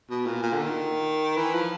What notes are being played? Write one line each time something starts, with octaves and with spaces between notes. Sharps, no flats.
B2
A#2
A#2
D3
D#3
E3
F3